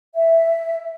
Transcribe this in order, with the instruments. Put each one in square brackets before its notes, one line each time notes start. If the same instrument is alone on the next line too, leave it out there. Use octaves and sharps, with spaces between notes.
[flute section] E5